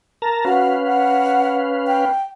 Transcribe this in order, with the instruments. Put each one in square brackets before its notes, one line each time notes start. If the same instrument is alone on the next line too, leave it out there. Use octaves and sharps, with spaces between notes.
[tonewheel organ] A#4 A5 A#5
[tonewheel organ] C#4 B4 F5 [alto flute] F#4
[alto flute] F#5
G5